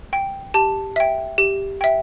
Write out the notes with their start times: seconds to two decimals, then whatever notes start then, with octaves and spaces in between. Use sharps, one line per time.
0.13 G5
0.54 G4 A5
0.96 E5 G5
1.38 G4
1.81 E5 G5